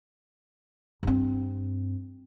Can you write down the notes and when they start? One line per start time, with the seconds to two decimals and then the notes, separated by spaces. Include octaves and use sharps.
1.03 G2 C4